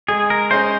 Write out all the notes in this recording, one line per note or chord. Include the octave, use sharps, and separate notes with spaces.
G#3 G#4
A#4
C#4 G#4 C5 D#5